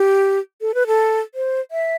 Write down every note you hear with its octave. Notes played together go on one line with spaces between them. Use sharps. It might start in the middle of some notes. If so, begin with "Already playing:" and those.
Already playing: G4
A4
B4
A4
C5
E5